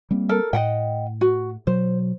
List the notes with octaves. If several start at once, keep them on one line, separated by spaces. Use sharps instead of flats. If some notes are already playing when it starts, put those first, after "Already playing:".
G3 A#3 C4
A4 A#4
A2 D#5 F#5 G5
F#4
B2 F#3 C5